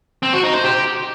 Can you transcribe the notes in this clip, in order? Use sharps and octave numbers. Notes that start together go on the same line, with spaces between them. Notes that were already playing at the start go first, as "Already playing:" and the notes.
C4
F#4
D#4
C5
G4